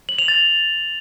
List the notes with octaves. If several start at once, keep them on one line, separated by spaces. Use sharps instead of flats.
F#7
F7
A6